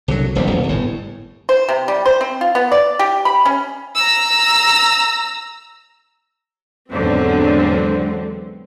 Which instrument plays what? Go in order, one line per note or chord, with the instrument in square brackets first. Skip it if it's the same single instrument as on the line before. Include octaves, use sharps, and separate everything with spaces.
[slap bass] C2 D3 F3 F#3
D#1 A#1 B2 G3
D#1 C2
G1 A2
[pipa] C5
C3
G3
C5
C4
F4
B3
D5
G4
B5
C#4
[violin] A#5 E6
[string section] E2 G#2 D3 F#3 C4